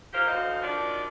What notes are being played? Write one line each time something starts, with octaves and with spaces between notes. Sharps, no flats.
A#3 D#4 F4 G4 A#4 C5
D2 A2 F#4 C5 D#5 F5
D#3 F3 D4 F#4 D5